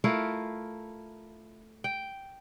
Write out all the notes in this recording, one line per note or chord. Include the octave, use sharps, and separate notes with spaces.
A3 E4 F4 A#4
G5